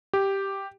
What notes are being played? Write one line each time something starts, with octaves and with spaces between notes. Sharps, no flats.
G4